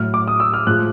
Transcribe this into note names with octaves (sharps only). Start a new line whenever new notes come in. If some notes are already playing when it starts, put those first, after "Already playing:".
Already playing: A2 F#3 F6
D6
D#6
E6
F6
A2 F3 G#3 F#6